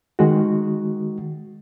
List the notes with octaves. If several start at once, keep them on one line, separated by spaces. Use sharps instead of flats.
D#3 G#3 F#4